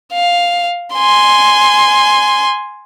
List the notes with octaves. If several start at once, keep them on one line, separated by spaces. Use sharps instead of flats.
F5
G#5 C6